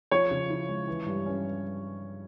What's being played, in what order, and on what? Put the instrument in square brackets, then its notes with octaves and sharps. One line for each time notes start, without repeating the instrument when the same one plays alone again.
[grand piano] F3 [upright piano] C#5
[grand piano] C#3
E4
G#3
E3
G2
C#4